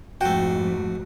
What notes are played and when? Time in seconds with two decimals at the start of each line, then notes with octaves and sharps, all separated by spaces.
0.21 F2 G#2 A3 F#4 G5